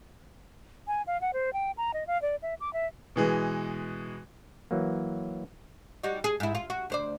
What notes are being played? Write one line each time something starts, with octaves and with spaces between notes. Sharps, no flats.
G#5
F5
F#5
C5
G5
A#5
D#5
F5
D5
E5
D6
E5
B2 E3 G#3
E3 F#3 A#3
G3 D#4 F#4
G#4
G#2 E4
F4
F#4
D2 C5 D5